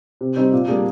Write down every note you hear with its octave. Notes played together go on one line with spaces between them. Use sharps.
C3
G3 C4 D#4
A#2
G3 A#3 D4 G#4